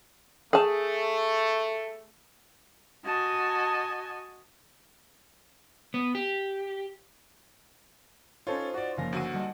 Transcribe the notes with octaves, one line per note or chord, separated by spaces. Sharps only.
A3 G#4 A5
F#4 D#5 G#5 A5
B3
G4
C#4 D#4 F4 A4 C5 C#5
F#4 D5
F#1 F3 A#3 F5 A#6
D2 F#4 D6 E6 C7 D#7
G3 A4 D#5 F#5